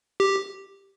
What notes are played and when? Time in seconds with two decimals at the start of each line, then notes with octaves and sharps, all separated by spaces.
0.20 G4